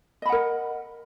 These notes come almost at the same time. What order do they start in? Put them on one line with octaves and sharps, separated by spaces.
D#5 B5 F#5 A#4